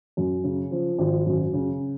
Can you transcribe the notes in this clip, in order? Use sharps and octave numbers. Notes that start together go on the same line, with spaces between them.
F#2
C#3
F3
G#1
F#2
C#3